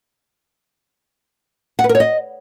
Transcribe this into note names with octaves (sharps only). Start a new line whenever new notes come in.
F#5
B4
A#4
C#5
D#5